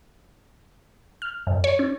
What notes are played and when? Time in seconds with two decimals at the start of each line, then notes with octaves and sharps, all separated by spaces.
1.22 F6
1.47 F#2
1.64 C#5
1.79 C#4